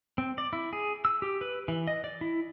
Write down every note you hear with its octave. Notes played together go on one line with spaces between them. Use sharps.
C4
D5
E4
G#4
E6
G4
B4
E3
D#5
D5
E4